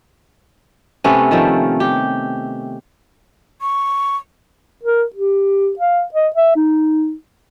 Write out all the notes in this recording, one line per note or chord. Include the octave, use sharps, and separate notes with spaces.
C3 A3 B3 C#4
D#3 F3 A3
G4
C#6
A#4
G4
F5
D#5
E5
D#4